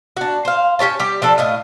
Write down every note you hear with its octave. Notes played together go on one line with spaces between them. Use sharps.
D4 F#4
C5 F5
C#4 G4 C#5 A5
G3 G4
F3 D4 A4
A2 D#5 F5